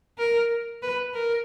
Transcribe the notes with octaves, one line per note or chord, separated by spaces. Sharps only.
A#4
B4
A#4